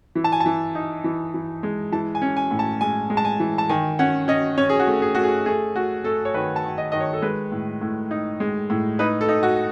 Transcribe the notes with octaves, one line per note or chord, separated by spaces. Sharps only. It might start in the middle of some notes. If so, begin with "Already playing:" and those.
E3
A5
G#5
A5
E3
D#4
E3
E3
G#3
E3 A5
G#5
C#4
G#5
A2
A5
G#3 G#5
G#3
A5
G#5
E3
A5
D#3 G#5
C#4 F#5
C#4 D#5
C#4 C#5
G#4
F#4
A3
G#4
A3 F#4
G#4
A3 G#4
A3 F#4
A3 A4
C#5
D#3 B4
A5
D#3
D#5
D#3 D#5
C#5
A4
G#3 B4
A2
A2
D#4
G#3
A2
D#4 B4
A4
D#4
F#4